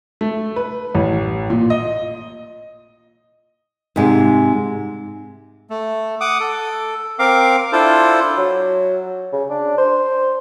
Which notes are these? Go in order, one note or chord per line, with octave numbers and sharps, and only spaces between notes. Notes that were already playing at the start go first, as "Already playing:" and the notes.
A3
B4
A1
A#2
D#5
G#2 C3 G#3
A3
F#5 D6 D#6
A4
C4 A#4 F5 D6
D4 E4 F4 A4 C5
F#3
C#3
D4
C5